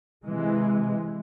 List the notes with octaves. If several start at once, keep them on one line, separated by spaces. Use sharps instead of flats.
C3 E3 G#3